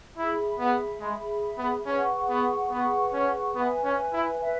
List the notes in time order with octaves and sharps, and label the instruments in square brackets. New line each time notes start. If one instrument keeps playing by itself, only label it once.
[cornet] E4 [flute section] G#4 E5 B5
[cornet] B3
[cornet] G#3 [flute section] G#4 E5 B5
[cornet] B3
[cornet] C#4 [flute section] G#4 B4 F#5 C#6
[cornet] B3
[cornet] B3 [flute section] G#4 B4 F#5 C#6
[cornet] C#4
[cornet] B3 [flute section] B4 E5 G#5
[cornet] C#4
E4
[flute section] B4 E5 G#5